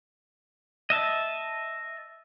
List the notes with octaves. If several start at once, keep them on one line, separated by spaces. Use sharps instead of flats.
D#5 E5 A5